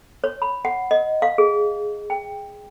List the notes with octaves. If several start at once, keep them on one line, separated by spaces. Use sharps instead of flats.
C#5
B5
F#5
D#5
F5
G#4
G5